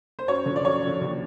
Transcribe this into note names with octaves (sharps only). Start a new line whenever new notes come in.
C5
F#2 C#5
D3 F3
D5
F#2 C#5
D3 F3
D#2